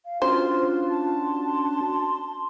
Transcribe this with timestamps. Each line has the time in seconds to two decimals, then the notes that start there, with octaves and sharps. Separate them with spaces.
0.05 F5
0.22 C#4 D4 F4 F#4 C5
0.90 A5
1.23 C6